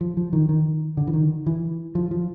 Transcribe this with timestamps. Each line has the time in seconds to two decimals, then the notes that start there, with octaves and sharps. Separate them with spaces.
0.01 F3
0.17 F3
0.33 D#3
0.49 D#3
0.97 D3
1.07 E3
1.14 D#3
1.46 E3
1.95 F3
2.11 F3